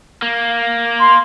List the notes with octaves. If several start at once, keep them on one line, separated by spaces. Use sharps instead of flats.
A#3
C6